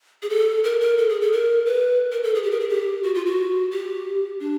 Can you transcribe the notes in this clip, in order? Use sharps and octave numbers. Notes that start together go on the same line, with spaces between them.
G#4
A4
A#4
A#4
A4
G#4
A4
A#4
B4
A#4
A4
G#4
G4
A#4
G#4
G4
F#4
F4
F#4
G4
D4